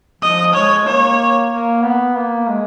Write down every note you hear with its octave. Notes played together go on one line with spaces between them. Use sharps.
F3 D#5
G#3 C#5
A#3 C#5
A#3
B3
A#3
G#3